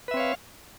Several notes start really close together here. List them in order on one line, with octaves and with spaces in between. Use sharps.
B4 E5 C4 C#5 F5